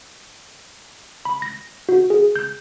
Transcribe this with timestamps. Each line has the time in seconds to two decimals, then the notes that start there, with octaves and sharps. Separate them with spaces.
1.25 B5
1.42 A#6
1.89 F#4
2.10 G#4
2.36 G6